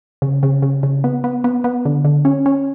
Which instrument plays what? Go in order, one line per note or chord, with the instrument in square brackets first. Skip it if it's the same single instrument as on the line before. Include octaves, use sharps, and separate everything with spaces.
[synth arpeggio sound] C#3
C#3
C#3
C#3
B3
B3
B3
B3
D3
D3
C#4
C#4